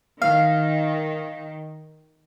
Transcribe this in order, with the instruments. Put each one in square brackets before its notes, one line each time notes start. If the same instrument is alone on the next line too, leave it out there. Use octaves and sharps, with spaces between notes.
[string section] D#3 [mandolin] F5